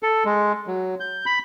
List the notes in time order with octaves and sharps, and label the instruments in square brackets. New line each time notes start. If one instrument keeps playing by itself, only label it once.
[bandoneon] A4
G#3
F#3
G6
B5